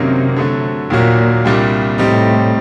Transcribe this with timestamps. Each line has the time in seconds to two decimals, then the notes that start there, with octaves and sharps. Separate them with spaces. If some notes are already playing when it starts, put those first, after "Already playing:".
Already playing: F#2 C3 D#3 F#3 A#3
0.36 D3 F#3 A3
0.90 D#2 A#2 D#3 F#3 A#3 F#4
1.44 C2 A#2 G3 D4 G4
1.98 A2 C3 G3 C4 D#4